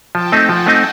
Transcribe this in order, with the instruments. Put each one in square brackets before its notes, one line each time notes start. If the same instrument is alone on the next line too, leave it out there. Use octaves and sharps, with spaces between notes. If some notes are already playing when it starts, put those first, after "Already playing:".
[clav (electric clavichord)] F3 [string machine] G5 A5
[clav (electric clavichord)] A3 C4 D#4
[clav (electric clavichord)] F3 [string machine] F#5 G#5
[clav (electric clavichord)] A3 C4 D#4